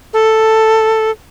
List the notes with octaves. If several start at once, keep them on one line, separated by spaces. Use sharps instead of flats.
A4